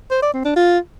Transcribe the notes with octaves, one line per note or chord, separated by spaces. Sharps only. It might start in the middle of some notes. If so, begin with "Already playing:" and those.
C5
D5
C4
D4
F4